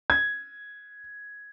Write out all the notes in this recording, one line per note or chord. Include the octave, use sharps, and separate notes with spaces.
G#6